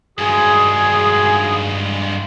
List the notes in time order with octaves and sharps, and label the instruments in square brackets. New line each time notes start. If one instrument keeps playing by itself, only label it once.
[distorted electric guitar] G2 G#3 [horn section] D#3 F#4 G#4